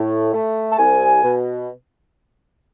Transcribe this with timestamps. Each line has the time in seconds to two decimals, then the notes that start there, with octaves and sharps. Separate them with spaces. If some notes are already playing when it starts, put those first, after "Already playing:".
Already playing: A2
0.34 A3
0.72 A5
0.78 C2 G#5
1.24 B2